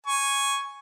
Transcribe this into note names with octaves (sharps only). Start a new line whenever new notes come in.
G#5 C#6